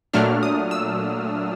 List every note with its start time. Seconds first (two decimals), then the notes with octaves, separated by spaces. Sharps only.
0.13 A#2 F#3 A3 D4 F6
0.43 D#6
0.71 E6